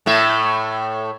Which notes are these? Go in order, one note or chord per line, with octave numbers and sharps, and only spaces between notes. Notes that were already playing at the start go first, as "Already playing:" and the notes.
A2 A3 E5